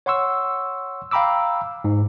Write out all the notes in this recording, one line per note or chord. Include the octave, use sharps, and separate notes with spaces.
C#5 F#5 C6 C#6 E6
F5 G5 A#5 B5 D6 E6
G#2